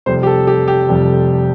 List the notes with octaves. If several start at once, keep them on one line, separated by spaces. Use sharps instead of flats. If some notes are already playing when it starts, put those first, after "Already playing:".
F1 F2 C3 G3 C5
G4
A4
G4
G4
F1 F2 C3 G3